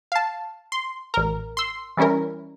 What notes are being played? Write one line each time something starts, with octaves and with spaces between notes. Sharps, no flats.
F5 A5
C6
A1 A#4
C6 E6
E3 G3 C#4 E4 A#4